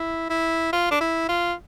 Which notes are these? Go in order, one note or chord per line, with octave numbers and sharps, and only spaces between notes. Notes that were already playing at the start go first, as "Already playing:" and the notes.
Already playing: E4
E4
F4
D4
E4
F4